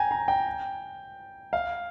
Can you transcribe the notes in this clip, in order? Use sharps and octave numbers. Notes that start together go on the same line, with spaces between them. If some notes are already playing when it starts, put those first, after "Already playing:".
Already playing: G5 G#5 A#5
A#5
G5
F5